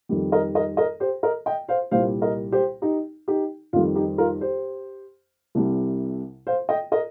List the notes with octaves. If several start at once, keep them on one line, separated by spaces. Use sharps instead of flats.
F2 D#3 G3
A#4 D#5
A#4 D#5
A#4 D#5
G4 C5
A#4 D#5
D#5 G5
C5 F5
C2 A#2 G3 C5 F5
A#4 D#5
G4 C5
D#4 G4
D#4 G4
F2 D#3 G3 F4
D#4 G4
F4 A#4
G4 C5
C2 C3 G3
C5 F5
D#5 G5
A#4 D#5